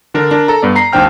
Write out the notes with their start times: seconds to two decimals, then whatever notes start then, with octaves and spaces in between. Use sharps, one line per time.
0.14 D3 D4 A#4
0.31 D4 A#4
0.48 A4 A#5
0.62 G2 B3 D5
0.76 A#5 C7
0.93 G#1 D#2 D4 C5 G5 F6